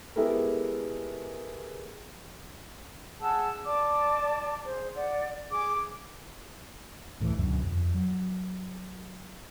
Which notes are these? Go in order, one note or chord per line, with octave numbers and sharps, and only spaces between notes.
G#3 B3 E4 G4 A4 A#4
G#4 F#5 A5 E6
D5 A5 D6
G#4 C5
D5 F#5
G#4 D6
C#2 A2 D#3 E3
C#2 F#2 B2 D3
F2
F#3